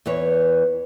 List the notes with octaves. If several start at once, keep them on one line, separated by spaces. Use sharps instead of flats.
E2 E3 B4 C#5